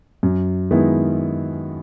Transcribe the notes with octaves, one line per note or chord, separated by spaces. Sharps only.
F#2
D#3 G#3 B3 E4